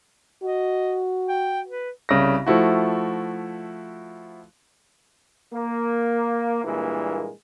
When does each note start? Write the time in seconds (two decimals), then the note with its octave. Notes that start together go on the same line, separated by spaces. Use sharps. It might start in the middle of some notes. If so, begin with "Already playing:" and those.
0.43 F#4 D#5
1.29 G5
1.68 B4
2.09 C2 C#3 A#6
2.47 F3 A3 E4 F#4
5.53 A#3
6.64 G2 A#2 E3 G#3 A#3